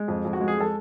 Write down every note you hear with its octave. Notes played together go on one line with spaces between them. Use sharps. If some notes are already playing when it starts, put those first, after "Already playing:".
Already playing: G#3
F2
F2
F#4
G#3
G#4
G#3 A4